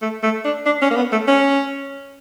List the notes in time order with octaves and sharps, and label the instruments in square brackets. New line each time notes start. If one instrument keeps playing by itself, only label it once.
[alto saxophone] A3
A3
D4
D4
C#4
A#3
B3
A3
C#4